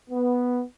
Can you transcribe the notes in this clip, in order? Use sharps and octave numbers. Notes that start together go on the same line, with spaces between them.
B3